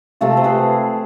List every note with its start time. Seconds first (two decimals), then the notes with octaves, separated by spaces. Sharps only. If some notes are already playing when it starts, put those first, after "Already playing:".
0.21 C3 F3 A3 F4 A4
0.37 C5
0.44 G#4 B4